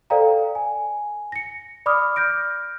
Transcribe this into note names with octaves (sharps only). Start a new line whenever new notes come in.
A4 C5 D5 F5 G5 A#5
G#5
A#6 C#7
D5 B5 D6 D#6 F6
F6 G6 A#6 D7